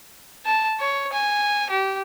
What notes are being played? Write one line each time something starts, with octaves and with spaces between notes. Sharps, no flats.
A5
C#5
G#5
G4